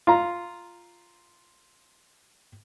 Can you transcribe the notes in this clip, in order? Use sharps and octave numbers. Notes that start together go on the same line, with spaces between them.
F4 A#5